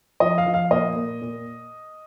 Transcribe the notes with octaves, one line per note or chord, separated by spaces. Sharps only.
F3 D#5
F5
F3
F5
A#2 D#5
A#2
A#2